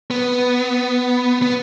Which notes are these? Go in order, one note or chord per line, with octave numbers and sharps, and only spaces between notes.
B3
B3